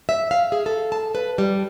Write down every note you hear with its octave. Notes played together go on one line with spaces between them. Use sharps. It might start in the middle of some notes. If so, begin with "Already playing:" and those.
E5
F5
G#4
A4
A5
B4
G3